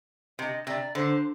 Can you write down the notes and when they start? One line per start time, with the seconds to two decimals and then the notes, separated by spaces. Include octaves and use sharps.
0.39 C3 D#5
0.67 C3 D5
0.95 D3 C5